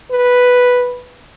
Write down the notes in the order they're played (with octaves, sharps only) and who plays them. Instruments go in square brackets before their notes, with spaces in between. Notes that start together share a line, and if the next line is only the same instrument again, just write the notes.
[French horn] B4